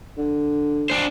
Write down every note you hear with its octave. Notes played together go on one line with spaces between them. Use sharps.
D3
D4 C5